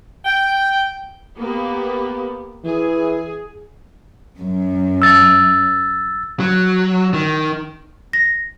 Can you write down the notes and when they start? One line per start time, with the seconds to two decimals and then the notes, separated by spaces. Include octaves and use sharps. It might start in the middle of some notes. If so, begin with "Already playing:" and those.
0.25 G5
1.38 A#3 B3 G4
2.64 E3 G#4
4.38 F#2
5.02 E6 A6
6.40 F#3
7.13 D#3
8.13 A#6